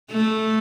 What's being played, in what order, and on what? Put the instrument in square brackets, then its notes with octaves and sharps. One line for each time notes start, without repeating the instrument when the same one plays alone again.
[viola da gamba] A3